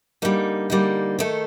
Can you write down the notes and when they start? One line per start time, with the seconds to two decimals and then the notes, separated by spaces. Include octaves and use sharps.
0.22 D3 G3 A#3 D#4
0.70 D3 G3 A#3 D#4
1.19 D#3 A3 D#4 A4